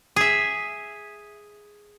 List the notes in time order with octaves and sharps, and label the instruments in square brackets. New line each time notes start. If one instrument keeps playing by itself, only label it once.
[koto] G#4 E5